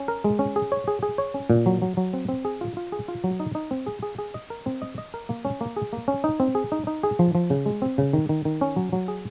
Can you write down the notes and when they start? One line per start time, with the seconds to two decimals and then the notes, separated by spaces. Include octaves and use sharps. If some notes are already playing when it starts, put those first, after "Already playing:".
Already playing: C#4
0.08 A#4
0.24 G#3
0.39 C#4
0.56 G#4
0.72 C#5
0.88 G#4
1.03 G#4
1.18 C#5
1.34 C#4
1.50 A#2
1.66 F#3
1.82 F#3
1.97 F#3
2.13 C4
2.29 C4
2.45 G#4
2.61 F4
2.77 F4
2.92 G#4
3.08 F4
3.24 F#3
3.40 D#4
3.55 D#4
3.71 C4
3.86 G#4
4.03 G#4
4.18 G#4
4.34 D#5
4.50 A#4
4.66 C4
4.82 D#5
4.98 D#5
5.14 A#4
5.29 A#3
5.45 C#4
5.61 A#3
5.76 G#4
5.93 A#3
6.08 C#4
6.24 D#4
6.40 C4
6.55 G#4
6.72 D#4
6.87 D#4
7.03 G#4
7.19 F3
7.35 F3
7.50 C#3
7.66 G#3
7.82 C4
7.98 C#3
8.13 D#3
8.29 D#3
8.45 D#3
8.61 C#4
8.76 F#3
8.93 F#3
9.08 G#4